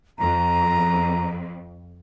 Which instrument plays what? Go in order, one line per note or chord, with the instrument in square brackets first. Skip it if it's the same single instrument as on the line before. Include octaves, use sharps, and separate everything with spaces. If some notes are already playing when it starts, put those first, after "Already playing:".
[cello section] F2 [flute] A#5